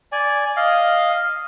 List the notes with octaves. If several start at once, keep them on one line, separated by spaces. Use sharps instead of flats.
D5 G#5
D#5 F5